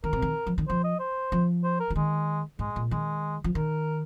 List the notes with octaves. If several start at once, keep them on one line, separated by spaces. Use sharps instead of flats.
D#3 A#4
C3
D#3
F3
D#3
F3 C5
D#5
C5
F3
C5
A#4
F3
D#3 G#3
G#2 G#3
A#2
D#3 G#3
F3
D#3 A#4